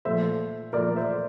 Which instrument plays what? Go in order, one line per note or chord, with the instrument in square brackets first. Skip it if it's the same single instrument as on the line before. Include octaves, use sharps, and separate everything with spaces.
[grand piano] A#2 F3 A3 C5 E5
A#2 F3 A3 A#4 D5
C5 E5